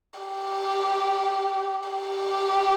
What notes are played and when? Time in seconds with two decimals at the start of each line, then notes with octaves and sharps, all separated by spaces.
0.20 G4
1.89 G4